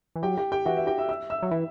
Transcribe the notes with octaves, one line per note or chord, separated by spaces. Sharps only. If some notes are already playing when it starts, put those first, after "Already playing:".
E3
F#3 G4 G5
G4 G5
G4 G5
E3 F#4 F#5
E5
G4 G5
E5 E6
E5 E6
E5 E6
F#3
E3